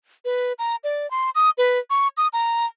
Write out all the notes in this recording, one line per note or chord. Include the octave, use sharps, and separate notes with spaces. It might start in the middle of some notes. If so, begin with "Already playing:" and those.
B4
A#5
D5
C6
D#6
B4
C#6
D#6
A#5